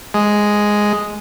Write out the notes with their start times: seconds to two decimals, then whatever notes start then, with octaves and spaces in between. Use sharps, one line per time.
0.14 G#3